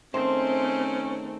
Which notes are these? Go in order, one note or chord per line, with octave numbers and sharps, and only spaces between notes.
D#3 A3 C4 C#4 G#4 C5